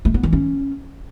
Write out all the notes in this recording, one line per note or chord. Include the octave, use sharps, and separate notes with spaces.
A3
B3
E3
C#4